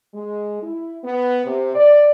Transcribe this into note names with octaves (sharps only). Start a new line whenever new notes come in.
G#3
E4
B3
C3
D5